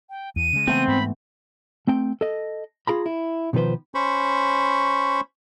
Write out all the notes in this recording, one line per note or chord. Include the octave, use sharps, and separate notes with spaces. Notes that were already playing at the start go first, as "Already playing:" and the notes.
G5
E2 D#7
C#3 G#3
E3 A3 B3 C4
G#2 B5
A3 C4 G5
A4 D#5
F4 G#4 A#5 B5
E4
B2 D#3 F3 B4 C5
C#4 C5 B5 C#6